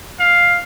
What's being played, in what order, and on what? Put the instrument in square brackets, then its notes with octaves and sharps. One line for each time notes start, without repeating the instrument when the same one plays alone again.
[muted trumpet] F5